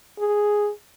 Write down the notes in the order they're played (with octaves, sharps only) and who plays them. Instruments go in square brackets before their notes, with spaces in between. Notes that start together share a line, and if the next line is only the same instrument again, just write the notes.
[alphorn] G#4